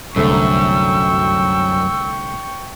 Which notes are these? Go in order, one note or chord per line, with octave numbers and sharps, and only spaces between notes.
C2 F#2 D3 A3 G5 C#6 E6